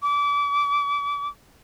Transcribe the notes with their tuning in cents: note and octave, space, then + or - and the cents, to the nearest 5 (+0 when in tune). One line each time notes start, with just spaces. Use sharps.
D6 -30